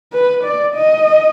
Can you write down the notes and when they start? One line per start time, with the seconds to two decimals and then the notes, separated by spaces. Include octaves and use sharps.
0.13 B4
0.44 D5
0.75 D#5